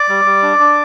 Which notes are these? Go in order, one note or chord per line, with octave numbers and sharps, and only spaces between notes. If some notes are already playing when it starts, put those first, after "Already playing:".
Already playing: D5 D6
G3
G3
D4
D4